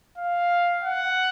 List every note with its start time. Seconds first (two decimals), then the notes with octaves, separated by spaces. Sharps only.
0.18 F5
0.83 F#5